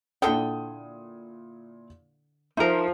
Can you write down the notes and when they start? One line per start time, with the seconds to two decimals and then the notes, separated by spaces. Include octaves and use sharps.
0.22 A#2 D3 E4 A4 G5 D#6
2.57 F3 D#4 A#4 E5